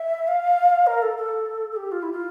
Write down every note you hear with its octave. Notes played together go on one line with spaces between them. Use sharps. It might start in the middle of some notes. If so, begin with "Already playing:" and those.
Already playing: E5
F5
A#4
A4
A4
A4
G4
F4
E4
F4